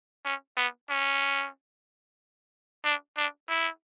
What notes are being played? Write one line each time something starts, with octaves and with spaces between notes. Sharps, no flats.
C#4
B3
C#4
D4
D4
E4